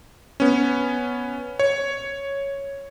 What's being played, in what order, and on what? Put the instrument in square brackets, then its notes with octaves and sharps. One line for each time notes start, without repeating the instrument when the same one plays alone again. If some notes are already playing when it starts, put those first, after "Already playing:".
[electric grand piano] B3 C#4
C#5